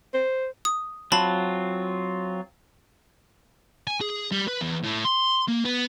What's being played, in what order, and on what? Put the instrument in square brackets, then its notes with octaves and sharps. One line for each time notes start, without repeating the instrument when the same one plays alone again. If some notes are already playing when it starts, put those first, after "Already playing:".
[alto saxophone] C5
[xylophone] D#6
[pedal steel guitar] F#3 C4 F4 [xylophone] A5 B5
[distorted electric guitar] G#5
G#4
G3
B4
E2
A2
C6
A#3
B3